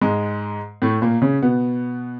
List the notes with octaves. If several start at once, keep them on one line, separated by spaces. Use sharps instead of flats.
G#2 G#3
A2 A3
A#2 A#3
C#3 C#4
B2 B3